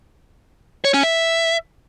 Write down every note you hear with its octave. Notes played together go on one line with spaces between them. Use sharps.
C#5
C#4
E5